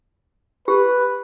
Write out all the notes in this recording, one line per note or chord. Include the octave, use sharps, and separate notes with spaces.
G4 B4